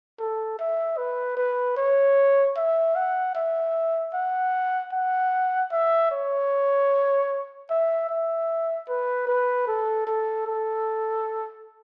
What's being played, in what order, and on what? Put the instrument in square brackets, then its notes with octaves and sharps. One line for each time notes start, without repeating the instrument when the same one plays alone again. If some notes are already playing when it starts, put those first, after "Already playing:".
[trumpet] A4
E5
B4
B4
C#5
E5
F#5
E5
F#5
F#5
E5
C#5
E5
E5
B4
B4
A4
A4
A4